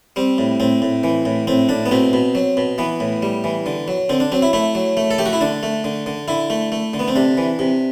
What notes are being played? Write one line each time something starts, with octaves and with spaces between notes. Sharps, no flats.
G3 C4
A2
A2 C4
A2
E3
A2
A2 C4
A2 D4
B3
B2 C4
B2
F#3
B2
E3 B3
A2
G3
E3
D3
F#3
D3 C4
D4
F#3 C4
E4
A3 E4
F#3
A3
A4
A3 G4
F#4
E4
D3 D4
A3
D3
D3
D3 E4
A3
A3
D3
B3
C4
C3 D4
E3
C3